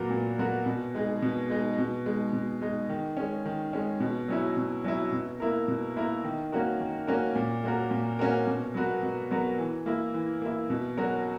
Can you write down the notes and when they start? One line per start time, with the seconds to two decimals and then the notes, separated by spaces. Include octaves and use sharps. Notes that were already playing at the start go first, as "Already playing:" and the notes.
Already playing: A#2 F#3 B3 F#4 A#4
0.10 A#2
0.38 F#3 B3 F#4 A#4
0.66 B2
0.95 G#3 D#4 G#4
1.22 B2
1.50 G#3 D#4 G#4
1.78 B2
2.06 G#3 D#4
2.33 B2
2.62 G#3 D#4
2.89 D#3
3.17 G#3 C#4
3.45 D#3
3.73 G#3 C#4
4.00 B2
4.28 F#3 C#4 E4
4.57 B2
4.84 F#3 C#4 E4
5.12 B2
5.40 A#3 E4 A#4
5.68 B2
5.96 A#3 E4 A#4
6.24 D#3
6.52 A#3 C#4 F#4 A#4
6.80 D#3
7.07 A#3 C#4 F#4 A#4
7.35 A#2
7.64 A#3 C#4 F#4 A#4
7.91 A#2
8.19 A#3 C#4 F#4 A#4
8.47 B2
8.74 F#3 B3 F#4 A#4
9.03 B2
9.31 F#3 B3 F#4 A#4
9.59 E3
9.86 A#3 E4
10.14 E3
10.42 A#3 E4
10.70 B2
10.97 F#3 C#4 F#4 A#4